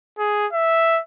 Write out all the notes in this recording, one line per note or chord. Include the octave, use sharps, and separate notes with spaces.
G#4
E5